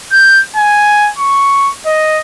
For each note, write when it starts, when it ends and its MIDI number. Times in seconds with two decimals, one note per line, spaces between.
0.12 0.40 91
0.57 1.10 80
1.18 1.71 85
1.86 2.20 75